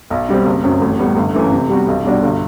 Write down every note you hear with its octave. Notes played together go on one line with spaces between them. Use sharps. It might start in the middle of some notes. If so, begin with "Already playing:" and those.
B1
B2 G3 C4
F#1
F#2 F#3 C4
A1
A2 G3 B3
G1
F#2 E3 A3
C3
G3 B3 F#4
B1
B2 G3 D4 F#4
G1